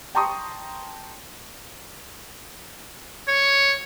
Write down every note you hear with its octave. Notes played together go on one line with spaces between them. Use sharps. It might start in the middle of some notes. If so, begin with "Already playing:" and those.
G5 A5 A#5 C6 C#6 D#6
C#5